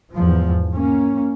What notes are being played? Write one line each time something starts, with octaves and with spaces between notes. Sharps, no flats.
E2 G#2 F3
A#3 C#4